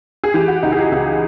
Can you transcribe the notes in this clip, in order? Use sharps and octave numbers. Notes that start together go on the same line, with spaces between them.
G#4
E3 G4
F#4
C#2 D#4
G#4
G4
C#2 G#4